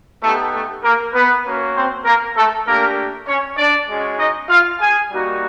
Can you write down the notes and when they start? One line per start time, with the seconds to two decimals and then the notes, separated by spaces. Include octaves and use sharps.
0.22 A3 B3 D#4 G4 A4
0.53 A3 A4
0.83 A#3 A#4
1.14 B3 B4
1.45 A#3 C#4 F#4
1.75 C4 C5
2.05 A#3 A#4
2.36 A3 A4
2.66 A3 A#3 D4 G4 A#4
3.27 C#4 C#5
3.58 D4 D5
3.88 G#3 C#4 F#4
4.19 D#4 D#5
4.49 F4 F5
4.80 G#4 G#5
5.10 G3 A#3 D#4 F#4